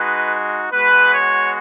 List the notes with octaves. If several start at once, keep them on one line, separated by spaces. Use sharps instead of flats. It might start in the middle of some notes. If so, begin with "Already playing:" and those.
Already playing: G#3 D#4 F#4 B4
G#3 B3 F#4 B4
C#5